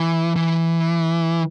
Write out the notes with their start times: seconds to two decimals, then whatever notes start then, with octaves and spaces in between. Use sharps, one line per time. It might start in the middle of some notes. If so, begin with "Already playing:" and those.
Already playing: E3
0.36 E3